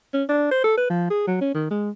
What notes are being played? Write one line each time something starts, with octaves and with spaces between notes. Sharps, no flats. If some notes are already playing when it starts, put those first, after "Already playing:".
C#4
D4
C5
A4
B4
F3
G#4
F#3
C#4
D#3
G#3